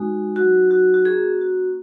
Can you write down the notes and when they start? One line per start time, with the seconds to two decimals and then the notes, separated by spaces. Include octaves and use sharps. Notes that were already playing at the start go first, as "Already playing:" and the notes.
Already playing: G#3 D#4 F#4
0.36 F#3 D#4 F#4
0.71 F#4
0.94 F#4
1.05 A#3 C#4 F#4 G#4
1.41 F#4